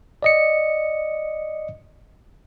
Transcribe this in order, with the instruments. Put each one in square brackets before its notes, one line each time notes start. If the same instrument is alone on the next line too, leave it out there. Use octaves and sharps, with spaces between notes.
[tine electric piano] D5 D#5 C#7